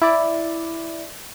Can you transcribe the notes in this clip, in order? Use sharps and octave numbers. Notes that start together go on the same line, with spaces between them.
E4 D5